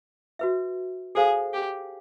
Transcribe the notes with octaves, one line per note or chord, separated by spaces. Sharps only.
F#4 B4 E5
G#4 A4 C5 F5
G4